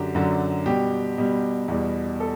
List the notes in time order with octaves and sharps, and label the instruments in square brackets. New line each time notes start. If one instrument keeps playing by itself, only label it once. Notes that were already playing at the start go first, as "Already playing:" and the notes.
Already playing: [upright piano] F#2 D3 F#3 G4
F#2 D3 F#3
B2 G3 G4
B2 G3
E2 B2 G3
A4